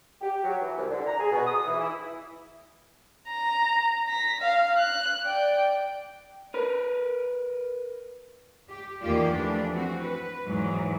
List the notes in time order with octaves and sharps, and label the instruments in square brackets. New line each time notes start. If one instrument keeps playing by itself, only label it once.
[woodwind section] G4
F#3
E3
C2
D3
A#5
G#4
B2
D#6
E3
E4
[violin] A#5
A#6 B6
F5
F#6
D5 G5
[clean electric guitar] A#4 B4
[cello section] G4
E2 D#3 A#3 F4 G4 D5
E3 F3 A3 D4
C4 F#4
B4
E2 G#2 E3 F#3